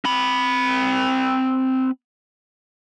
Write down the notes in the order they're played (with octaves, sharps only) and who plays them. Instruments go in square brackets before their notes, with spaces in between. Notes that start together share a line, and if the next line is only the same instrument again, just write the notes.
[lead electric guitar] C4 B5